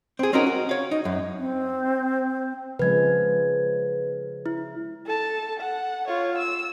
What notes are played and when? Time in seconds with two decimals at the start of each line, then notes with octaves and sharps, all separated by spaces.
0.19 C4 G#4
0.33 C4 C#4 D#4 F#4 A#4
0.46 F#4
0.69 C#5 F5
0.91 D#4
1.05 F#2
1.38 C4
2.79 C#3 F3 G#3 B4 G#6
4.46 E4
5.06 A4 A5
5.60 F#5
6.08 F4 C#5
6.38 E6